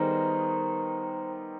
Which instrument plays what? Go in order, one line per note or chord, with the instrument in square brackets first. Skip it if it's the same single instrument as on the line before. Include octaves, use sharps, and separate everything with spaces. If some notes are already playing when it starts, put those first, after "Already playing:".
Already playing: [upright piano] D#3 G3 B3 D#4 G#4 [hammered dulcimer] A#4 C5